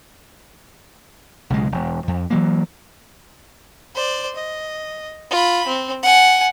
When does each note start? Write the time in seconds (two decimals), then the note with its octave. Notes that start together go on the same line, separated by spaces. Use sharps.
1.50 B1 C#3 G#3
1.72 E1
2.08 F2
2.30 E3 F#3 A#3
3.95 C5 D5
4.36 D#5
5.30 F4 B5
5.67 C4
6.03 F#5 G#5